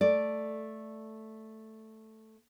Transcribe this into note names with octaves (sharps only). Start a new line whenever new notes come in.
A3 D5